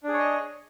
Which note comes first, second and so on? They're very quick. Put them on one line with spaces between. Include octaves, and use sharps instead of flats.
D4 G#4 C#5 D#5